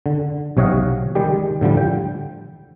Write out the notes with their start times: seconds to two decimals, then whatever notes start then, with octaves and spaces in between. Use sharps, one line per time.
0.06 D3
0.57 B1 C3 C#5 D#5 F5 F#5
1.15 D#3 G3 G#3 G4
1.61 A2 D3 F3 G3
1.77 G5